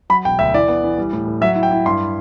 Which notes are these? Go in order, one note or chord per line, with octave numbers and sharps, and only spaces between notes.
F#3 B5
E1 G5
D2 E5
E3 D5
B3
E3
G3
A2
A2
F#3 E5
E4
G5
E4
G2 C6